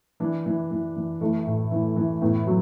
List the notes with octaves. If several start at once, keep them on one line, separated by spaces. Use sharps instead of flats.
E3 D4
E3
E3
E3
E3 A3
A2
E3
E3
A2 B3
F#3